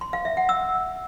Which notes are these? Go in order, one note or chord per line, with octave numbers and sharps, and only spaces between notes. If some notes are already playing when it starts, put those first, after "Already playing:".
C6
F5
E5
F#5
E6